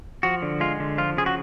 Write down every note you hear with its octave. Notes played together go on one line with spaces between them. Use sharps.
F3 F#4
D3
G#3 F4
D3
F3 F4
C#3 G#4
F#4